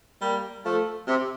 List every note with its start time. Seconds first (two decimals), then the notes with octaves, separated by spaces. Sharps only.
0.21 G3 A#3
0.64 F3 A3
1.07 C3